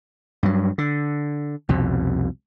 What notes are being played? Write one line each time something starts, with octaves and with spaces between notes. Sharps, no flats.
G2 F#3
D3
C2 F2 B2